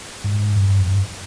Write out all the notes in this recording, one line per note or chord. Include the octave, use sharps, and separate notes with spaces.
G#2
G2
F#2
G2